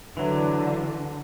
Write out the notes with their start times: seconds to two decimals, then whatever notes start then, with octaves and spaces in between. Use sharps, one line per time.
0.17 D3 E3 F#3